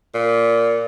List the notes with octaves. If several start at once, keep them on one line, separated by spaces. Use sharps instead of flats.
A#2